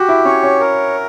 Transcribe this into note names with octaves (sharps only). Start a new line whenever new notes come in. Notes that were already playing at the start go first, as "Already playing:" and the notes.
Already playing: F#4 G4
E4
C#4 C#5
C#4
A#4